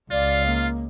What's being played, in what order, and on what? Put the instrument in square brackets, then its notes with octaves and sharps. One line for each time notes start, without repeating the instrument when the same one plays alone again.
[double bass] C#2 [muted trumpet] F4 [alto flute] D5 [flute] F5
[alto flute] A#3